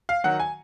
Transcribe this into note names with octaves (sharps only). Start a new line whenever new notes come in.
F5
D#3 F#3 F#5
G#5